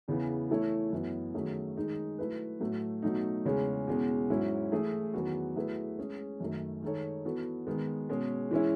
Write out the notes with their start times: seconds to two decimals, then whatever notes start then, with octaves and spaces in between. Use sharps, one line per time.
0.08 E2 C#3 E3 B3
0.50 E3 A3 E4 A4 C#5
0.93 F#2 E3 B3
1.34 D#3 F#3 A3 C#4 G#4
1.77 D#3 G#3 D#4 G#4
2.19 F#3 A3 E4 B4
2.60 A2 F#3 A3
3.02 B2 F#3 A3 D#4
3.45 E2 C#3 G#3 C#4
3.87 E2 B2 G#3 C#4
4.30 G#2 F#3 C#4 E4
4.72 E3 A3 E4 G#4
5.14 E2 D#3 F#3 B3 F#4
5.56 F#3 A3 E4 G#4 B4
5.98 G#3 C#4 G#4 C#5
6.40 F#2 D#3 A3
6.82 D#3 G#3 D#4 A4 C#5
7.25 E3 B3 F#4 A4
7.67 D#3 G#3 B3
8.09 B2 G#3 C#4 G#4
8.51 E3 G#3 C#4 E4